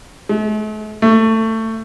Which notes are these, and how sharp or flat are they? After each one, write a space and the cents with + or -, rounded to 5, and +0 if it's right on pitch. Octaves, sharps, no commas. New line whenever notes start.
A3 -45
A3 +20